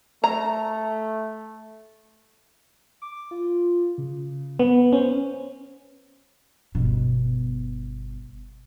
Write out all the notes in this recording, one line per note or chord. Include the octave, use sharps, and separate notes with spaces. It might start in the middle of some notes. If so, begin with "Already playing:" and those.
A3 A#5
D6
F4
C#3
B3
C#4 C5
G1 B2